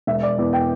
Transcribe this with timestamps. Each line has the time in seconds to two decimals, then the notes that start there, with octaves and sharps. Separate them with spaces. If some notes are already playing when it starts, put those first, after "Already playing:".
0.07 E1 E5
0.23 D5
0.38 E2 D5
0.53 G5